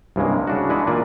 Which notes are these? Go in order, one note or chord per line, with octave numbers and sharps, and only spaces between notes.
C2 G2 C#3 G#3 A#3
C#3 D4 F#4
E3 G#3 D4 F#4 B4
A#2 A#3 D5 G#5